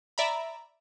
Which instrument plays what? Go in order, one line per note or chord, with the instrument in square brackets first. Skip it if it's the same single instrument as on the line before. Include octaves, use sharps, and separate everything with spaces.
[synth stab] D5 E5 A#5 B5